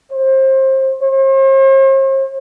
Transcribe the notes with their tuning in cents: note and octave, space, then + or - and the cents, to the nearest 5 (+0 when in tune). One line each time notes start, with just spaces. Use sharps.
C5 +25
C5 +45